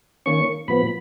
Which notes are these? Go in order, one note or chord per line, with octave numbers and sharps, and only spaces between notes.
D#3 A#3 C#4 C#6
A#2 F3 B3 B5